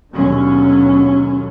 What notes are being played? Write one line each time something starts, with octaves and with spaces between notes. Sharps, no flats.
D#2 B2 D3 F#3 C#4